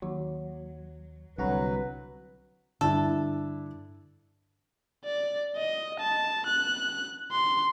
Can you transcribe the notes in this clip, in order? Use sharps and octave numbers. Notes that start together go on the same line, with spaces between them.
D#2 F#3
C2 D3 F#3 F#4 B4 A#5
G2 D3 D4 E4 A4
D5
D#5
A5
F#6
C6